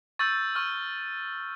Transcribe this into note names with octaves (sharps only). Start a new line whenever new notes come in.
C#6 E6 G6 A6
C#6 F6